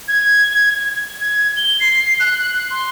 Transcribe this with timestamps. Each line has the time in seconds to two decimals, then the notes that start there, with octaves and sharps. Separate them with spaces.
0.08 G#6
1.21 G#6
1.57 G7
1.80 C7
2.20 F#6
2.71 C6